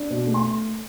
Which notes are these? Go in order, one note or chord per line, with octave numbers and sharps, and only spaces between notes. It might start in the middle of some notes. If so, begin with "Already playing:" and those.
Already playing: D4
B2
A3
C6